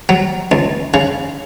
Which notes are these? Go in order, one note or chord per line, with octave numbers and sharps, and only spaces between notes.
F#3
C#2
C#3